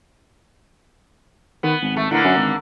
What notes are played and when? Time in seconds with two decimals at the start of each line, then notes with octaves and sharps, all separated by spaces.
1.63 D#3 B3
1.81 G#1
1.97 A3
2.11 A2 D3 A#3 B3
2.24 F#2
2.37 G#1